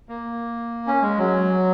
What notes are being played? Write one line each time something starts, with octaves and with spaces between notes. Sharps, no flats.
A#3
C#4
G#3
F#3